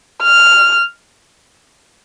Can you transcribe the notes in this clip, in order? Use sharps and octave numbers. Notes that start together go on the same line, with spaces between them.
F6